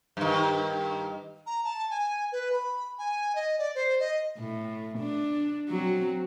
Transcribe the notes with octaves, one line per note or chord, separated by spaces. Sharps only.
G2 D#3
A#5
A5
G#5
B4
B5
G#5
D#5
D5
C5
D#5
A2
D4
F#3 C4